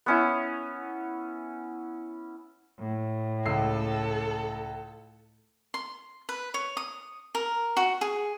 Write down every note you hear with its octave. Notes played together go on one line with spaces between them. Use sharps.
B3 C#4 E4
A2
C#2 A4 E6 C7
C6
B4
C#5
D#6
A#4
F#4
G#4